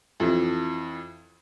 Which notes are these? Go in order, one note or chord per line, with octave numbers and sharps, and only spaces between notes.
F2 E3